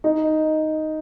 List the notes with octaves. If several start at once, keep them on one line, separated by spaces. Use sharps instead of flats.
D#4